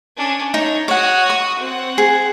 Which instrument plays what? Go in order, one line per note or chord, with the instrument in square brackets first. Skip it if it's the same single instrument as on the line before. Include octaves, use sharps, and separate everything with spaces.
[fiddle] C#4 D4
[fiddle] D4 C#5 [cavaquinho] D#4
[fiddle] F#4 D#6 [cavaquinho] C#5 F#5
[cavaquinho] C#6
[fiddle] C4 F#5
[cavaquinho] G#4